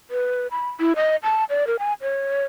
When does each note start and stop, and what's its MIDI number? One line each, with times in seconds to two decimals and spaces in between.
0.11 0.47 71
0.51 0.69 83
0.80 0.93 64
0.96 1.16 75
1.23 1.44 81
1.50 1.67 74
1.67 1.76 70
1.79 1.93 80
2.02 2.45 73